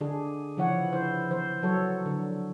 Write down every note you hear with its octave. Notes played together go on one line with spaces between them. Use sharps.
D3 D4 G#4
C#3 E3 F3 E4 C#5 F#5
E4 C5
E3 C5
F#3 A4 C#5
D3